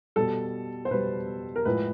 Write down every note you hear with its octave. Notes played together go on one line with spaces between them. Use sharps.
B2 G3 A4
C5
B2 G3 B4
A#4
A2 F3 G#3 B4